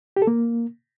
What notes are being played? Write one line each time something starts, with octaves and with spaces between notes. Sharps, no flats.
G4
A4
A#3